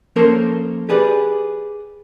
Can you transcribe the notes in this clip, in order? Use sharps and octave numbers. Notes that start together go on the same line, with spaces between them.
F3 A#3 C#4 A4 A#4 C5
G4 G#4 B4 D5